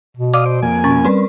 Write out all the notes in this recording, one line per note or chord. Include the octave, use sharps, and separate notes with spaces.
B2
D5 F5 D6 D#6
C5 D7
F2 A#3 G#5
B2 C#4 A#4 C#6
G3 C4 A#4 B4